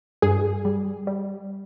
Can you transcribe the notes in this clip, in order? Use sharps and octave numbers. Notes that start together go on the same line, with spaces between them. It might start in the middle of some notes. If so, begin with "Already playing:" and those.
G2 G#4
G3
G3